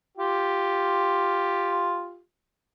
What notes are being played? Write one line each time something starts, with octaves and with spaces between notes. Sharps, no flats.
F4 G4